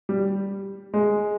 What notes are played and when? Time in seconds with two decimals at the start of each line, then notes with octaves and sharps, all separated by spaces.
0.09 G3
0.94 G#3